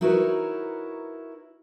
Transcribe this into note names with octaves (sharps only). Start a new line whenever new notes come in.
D#4 E4 F#4 A#4 B4 C#5